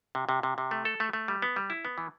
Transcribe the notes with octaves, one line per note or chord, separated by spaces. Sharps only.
C3
C3
C3
C3
A3
A4
A3
A3
G3
B3
G3
E4
B3
E3